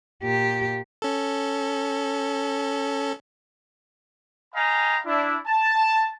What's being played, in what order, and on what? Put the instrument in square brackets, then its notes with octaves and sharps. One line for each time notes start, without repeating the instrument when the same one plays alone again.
[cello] A#2 G4
[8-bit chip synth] C#4 A4
[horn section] D#5 F5 G5 G#5 A#5 B5
D4 E4
A5